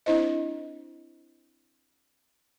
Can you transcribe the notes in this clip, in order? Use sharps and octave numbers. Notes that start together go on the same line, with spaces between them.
C4 D4 E4 C5 D#5